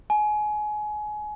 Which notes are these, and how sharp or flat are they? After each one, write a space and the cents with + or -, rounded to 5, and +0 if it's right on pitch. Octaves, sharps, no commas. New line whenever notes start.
G#5 +25